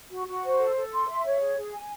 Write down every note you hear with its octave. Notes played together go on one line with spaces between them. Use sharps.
F#4
F#4
C5
A4
A4
C6
E5
C#5
G#4
G#4
G#5